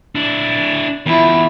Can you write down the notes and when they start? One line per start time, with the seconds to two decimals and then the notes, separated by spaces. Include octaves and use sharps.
0.15 D4 E4
1.06 E2 F3 E4